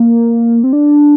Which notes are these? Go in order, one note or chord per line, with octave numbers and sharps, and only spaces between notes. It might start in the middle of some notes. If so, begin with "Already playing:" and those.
Already playing: A#3
C4
D4